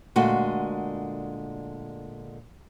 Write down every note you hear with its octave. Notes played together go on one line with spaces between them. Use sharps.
A#2 D3 G#3 A3 F#4